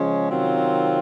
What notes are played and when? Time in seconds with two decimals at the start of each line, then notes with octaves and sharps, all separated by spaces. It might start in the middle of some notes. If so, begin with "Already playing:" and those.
Already playing: C#3 F3 G#3 C#4
0.29 C3 D#3 F#3 C4 F4